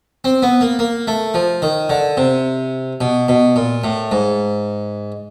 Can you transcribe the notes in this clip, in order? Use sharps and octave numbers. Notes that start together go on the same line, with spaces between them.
C4
B3
A#3
A#3
A3
F3
D#3
D3
C3
B2
B2
A#2
A2
G#2